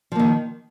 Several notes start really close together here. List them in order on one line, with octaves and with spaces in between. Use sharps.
F3 A#3 D#3